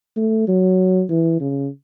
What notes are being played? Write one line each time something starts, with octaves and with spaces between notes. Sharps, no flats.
A3
F#3
E3
C#3